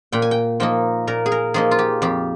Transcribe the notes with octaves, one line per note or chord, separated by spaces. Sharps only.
A#2 G5
G#5
G5
F3 A#3 D#4 G5
A#2 A#4
G#4
A#4
F3 A#3 D#4 G#4
F4
G4
F2 G4